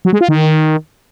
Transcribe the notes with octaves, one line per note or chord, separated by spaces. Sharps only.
F#3
G#3
F4
D#3